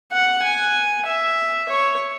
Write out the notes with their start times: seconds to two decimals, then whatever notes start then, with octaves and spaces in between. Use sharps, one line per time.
0.12 F#5
0.43 G#5
1.06 E5
1.69 C#5